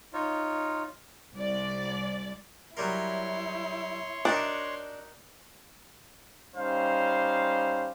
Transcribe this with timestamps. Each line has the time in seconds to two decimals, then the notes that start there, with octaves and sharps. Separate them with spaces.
0.13 D#4 F4 C#5
1.34 C2 D5
2.77 F#3 G3 E4 A#4 C#5 C6
4.25 D4 D#4 F#4 A#4
6.54 G3 C#4 D#4 C5 F5